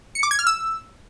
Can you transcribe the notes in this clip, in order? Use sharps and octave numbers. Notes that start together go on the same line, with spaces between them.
C#7
D6
G#6
F6
E6